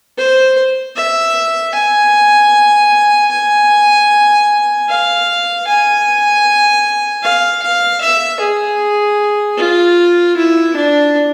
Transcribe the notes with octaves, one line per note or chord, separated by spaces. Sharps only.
C5
E5
G#5
G#5
F5
G#5
F5
F5
E5
G#4
F4
E4
D4